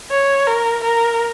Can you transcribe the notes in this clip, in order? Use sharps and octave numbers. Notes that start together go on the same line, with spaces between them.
C#5
A#4
A#4